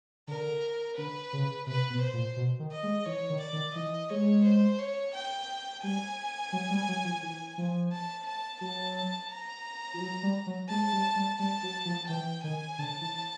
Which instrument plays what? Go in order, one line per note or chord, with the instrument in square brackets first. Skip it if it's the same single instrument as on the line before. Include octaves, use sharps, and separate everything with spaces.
[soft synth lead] D3 [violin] A#4
[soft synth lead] D3 [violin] B4
[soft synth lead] C#3
[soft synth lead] C3 [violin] B4
[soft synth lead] B2
[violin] C5
[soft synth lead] A#2
B2
D#3
[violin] D#5
[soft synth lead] G#3
[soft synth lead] E3 [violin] C#5
[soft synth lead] D#3
[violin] D5
[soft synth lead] D#3
[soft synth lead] E3 [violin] D#5
[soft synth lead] G#3 [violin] C#5
[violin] C5
C#5
G5
[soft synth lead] G3 [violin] G#5
[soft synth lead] F#3
G3
F#3
F3
E3
F3
[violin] A5
A5
[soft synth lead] F#3 [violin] A5
[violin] A#5
[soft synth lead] F3
F#3
G3
F#3
[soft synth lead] G#3 [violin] A5
[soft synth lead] G3
G3
[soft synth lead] G3 [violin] A5
[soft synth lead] F#3
F3
[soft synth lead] E3 [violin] G5
[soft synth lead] D#3 [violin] G#5
[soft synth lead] D3 [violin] A5
[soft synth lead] E3